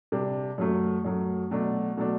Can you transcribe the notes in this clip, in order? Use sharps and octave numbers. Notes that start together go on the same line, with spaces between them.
C3 G3 D4
F#2 F#3 A3
F#2 F#3 A3
B2 F#3 A3 D4
B2 F#3 A3 D4